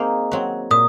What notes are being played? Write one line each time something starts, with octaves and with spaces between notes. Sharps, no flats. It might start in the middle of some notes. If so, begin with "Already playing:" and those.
Already playing: A#3 C4 D#4 G#4 C5
F#3 C4 F#4
A#2 D#6